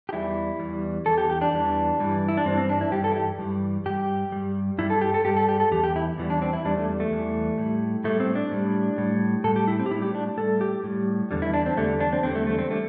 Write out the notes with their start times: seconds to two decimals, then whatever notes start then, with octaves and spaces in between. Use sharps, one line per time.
0.09 G4
0.13 E2 E3 G3 E4
0.60 E2 E3 G3
1.06 E2 E3 A4
1.18 G4
1.30 G4
1.41 D4
1.53 E2 E3 G3
1.99 G2 E3 G3
2.28 E4
2.37 D4
2.46 G2 E3 G3 C4
2.58 C4
2.69 D4
2.81 E4
2.92 G2 E3 G3 G4
3.04 A4
3.12 E4
3.16 G4
3.39 G2 E3 G3
3.86 G2 G3 G4
4.32 G2 G3
4.78 G2 G3 E4
4.90 A4
5.01 G4
5.14 A4
5.25 G2 G3 G4
5.37 A4
5.49 G4
5.60 A4
5.71 E2 E3 G4
5.84 G4
5.96 E4
6.18 E2 E3 G3
6.30 D4
6.42 C4
6.53 E4
6.65 E2 E3 G3 D4
6.77 A3
7.00 A3
7.11 E2 E3 G3
7.58 A2 G3
8.04 A2 G3 A3
8.20 C4
8.35 D4
8.52 A2 G3
8.98 A2 G3
9.44 A2 A4
9.48 G3
9.56 G4
9.68 E4
9.79 C4
9.86 G4
9.91 A2 E4
9.95 G3
10.02 G4
10.15 D4
10.37 A2 G3 A4
10.61 G4
10.84 A2 G3
11.31 E2 D3 G3
11.42 E4
11.54 D4
11.66 C4
11.77 E2 D3 G3 A3
12.01 D4
12.12 C4
12.23 E2 D3 G3 C4
12.35 A3
12.47 A3
12.58 C4
12.71 D3 G3 A3